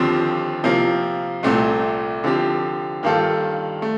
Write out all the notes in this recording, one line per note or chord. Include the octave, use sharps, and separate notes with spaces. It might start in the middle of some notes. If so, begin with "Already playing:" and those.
Already playing: D#2 D3 F3 C4 G4
C3 F3 A#3
C2 A#2 A3 C4
D3 F3 C4 G4
G2 D#3 A#3 F4 A4
A3